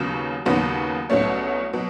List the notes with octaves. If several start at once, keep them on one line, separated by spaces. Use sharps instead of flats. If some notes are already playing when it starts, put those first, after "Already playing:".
Already playing: D#2 C#3 F#3 B3
D#2 C#3 F#3 B3
C2 B2 F#3 A3 C#4
B2 F#3